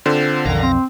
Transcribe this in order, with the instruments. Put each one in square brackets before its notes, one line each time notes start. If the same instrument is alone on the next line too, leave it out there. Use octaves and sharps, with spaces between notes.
[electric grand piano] D3 [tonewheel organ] C4 F4 C5
[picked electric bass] B1 F2 [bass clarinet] D#3 [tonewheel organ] F5 A#6
[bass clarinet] C4